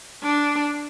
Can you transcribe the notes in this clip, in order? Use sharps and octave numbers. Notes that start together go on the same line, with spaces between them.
D4